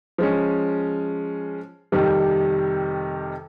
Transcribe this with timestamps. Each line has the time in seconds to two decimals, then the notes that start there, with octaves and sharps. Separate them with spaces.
0.18 F3 G#3 C#4
1.92 F2 C3 D#3 G3